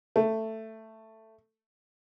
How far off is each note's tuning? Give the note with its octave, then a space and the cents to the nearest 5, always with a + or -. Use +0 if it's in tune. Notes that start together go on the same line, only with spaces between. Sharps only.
A3 +10